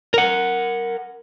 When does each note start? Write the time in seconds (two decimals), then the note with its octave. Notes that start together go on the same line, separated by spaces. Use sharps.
0.14 A#4 F#5